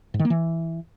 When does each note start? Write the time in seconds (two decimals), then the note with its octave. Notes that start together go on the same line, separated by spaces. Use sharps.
0.14 G#2
0.19 D#3
0.25 A#3
0.30 E3